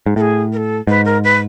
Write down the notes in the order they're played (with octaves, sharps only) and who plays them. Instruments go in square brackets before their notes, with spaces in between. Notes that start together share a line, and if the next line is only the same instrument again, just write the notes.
[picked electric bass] G#2
[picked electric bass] A2 [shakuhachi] A4
[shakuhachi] G#4
A#4
A4
[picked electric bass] G#2 [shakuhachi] B4
[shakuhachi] A#4
B4